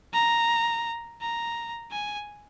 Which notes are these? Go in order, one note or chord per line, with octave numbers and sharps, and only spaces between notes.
A#5
A#5
G#5